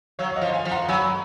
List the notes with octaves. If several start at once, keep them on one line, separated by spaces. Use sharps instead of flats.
F#3 C#5 F5
F5
D#5 F#5
F3
F5 G#5
F3
F#5 A#5
F#3 G#5 B5